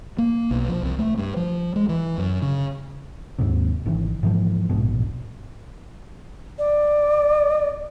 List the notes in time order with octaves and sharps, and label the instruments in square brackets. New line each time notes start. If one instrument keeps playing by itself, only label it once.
[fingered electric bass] A#3
B1
F3
C2
A3
G2
F3
G#3
E3
F#2
C#3
[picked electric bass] D#2 G#2 C3
G#1 C3 D#3 E3
G#2 E3 F3
E1 A#1 G#2 B2
[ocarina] D5